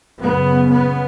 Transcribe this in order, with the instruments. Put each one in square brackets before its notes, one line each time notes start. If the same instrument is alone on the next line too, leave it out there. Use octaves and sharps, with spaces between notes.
[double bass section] F#2 C#3 B3
B3